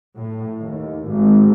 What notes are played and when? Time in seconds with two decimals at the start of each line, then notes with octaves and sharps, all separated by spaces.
0.17 A2
0.61 D#2
1.08 G#1